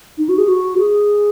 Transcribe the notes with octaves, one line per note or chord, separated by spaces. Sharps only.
D#4
F#4
G#4
F#4
G#4